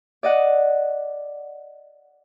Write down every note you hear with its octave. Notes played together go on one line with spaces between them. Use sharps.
D5 D#5 F#5